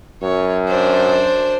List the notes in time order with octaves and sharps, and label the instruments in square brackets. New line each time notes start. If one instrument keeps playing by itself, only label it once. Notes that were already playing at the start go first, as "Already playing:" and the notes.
[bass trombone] F#2 [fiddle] C#5
[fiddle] D4 C5